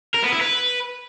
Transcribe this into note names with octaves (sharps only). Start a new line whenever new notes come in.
A#4
B3
E4
B4